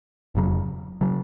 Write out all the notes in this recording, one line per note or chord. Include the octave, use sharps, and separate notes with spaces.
F1 F2 C#3 F#3
C#3 F#3